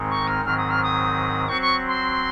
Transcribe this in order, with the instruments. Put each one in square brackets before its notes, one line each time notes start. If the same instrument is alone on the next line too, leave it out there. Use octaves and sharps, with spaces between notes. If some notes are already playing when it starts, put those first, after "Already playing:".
Already playing: [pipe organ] G#2 D#3 G#3 C4 D#4
[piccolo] C#6
F6
[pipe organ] G#2 D#3 F#3 C4 [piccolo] F6
[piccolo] D#6
F6
D#6
[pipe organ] F#3 C4 F#4 C5 [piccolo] C#6
[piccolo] C#6
C6